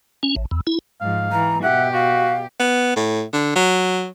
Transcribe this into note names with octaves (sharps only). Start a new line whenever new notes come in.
C#4
A1
E2
E4
G#2 F3 F5
E3 A#5
B2 G4 E5 F#5
F#4 F5
B3
A2
D3
F#3